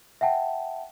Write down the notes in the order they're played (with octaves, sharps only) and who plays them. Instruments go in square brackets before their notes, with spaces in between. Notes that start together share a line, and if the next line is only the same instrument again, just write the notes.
[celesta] E5 F#5 G5 A5